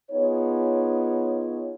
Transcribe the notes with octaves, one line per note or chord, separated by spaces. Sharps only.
B3 D#4 F4 G#4 C#5